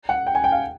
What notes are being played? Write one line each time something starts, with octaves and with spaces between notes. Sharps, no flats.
F#5
G5
G#5
G5
F5